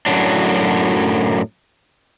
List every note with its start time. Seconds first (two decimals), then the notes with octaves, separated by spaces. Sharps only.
0.06 F#2 A2 F#3 D4